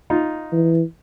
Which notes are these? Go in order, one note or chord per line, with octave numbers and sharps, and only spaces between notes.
D#4 F4
E3